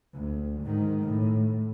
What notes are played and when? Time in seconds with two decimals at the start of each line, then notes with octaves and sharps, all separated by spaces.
0.13 D2
0.61 G#2 D#3
1.03 A2